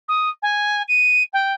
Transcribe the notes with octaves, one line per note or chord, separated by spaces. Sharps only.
D#6
G#5
D#7
G5